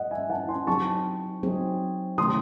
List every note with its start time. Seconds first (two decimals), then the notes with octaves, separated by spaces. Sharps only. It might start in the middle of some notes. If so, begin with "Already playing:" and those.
Already playing: D#5 F#5
0.11 E5 G#5
0.30 F#5 A5
0.48 G#5 C6
0.67 F#3 C4 D#4 G#4 A5 C#6
1.43 F#3 C4 D#4 G#4
2.18 C3 D#3 A3 C#4 C6 D#6